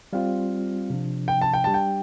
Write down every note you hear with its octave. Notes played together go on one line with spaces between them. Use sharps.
G3 C4 F4 F5
C3 F3 D4
G5
A5
G5
G3 D4 G4 A5
G5